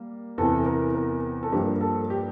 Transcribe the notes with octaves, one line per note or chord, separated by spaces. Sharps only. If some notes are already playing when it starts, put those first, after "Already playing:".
Already playing: G3 A#3
E2 C3 E3 A4
A#4
A#4
A4
G2 F3 A#3 G4
A4
G4